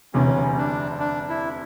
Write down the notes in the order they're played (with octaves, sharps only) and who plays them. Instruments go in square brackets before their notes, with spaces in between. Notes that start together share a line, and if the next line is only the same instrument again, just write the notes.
[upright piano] E1 D2 C3 E3 [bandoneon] C#4
[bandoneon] D4
D4
E4